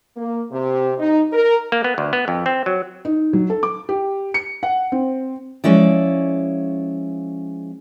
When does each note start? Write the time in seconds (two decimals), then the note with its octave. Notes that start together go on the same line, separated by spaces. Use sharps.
0.16 A#3
0.50 C3
0.98 D#4
1.33 A#4
1.72 A#3
1.84 B3
1.98 D2
2.13 B3
2.28 F2
2.46 C4
2.66 F#3
3.05 D#4
3.33 F#3
3.50 A4
3.63 D6
3.89 G4
4.34 C#7
4.63 F#5
4.92 C4
5.64 F3 G#3 C#4 E4 D5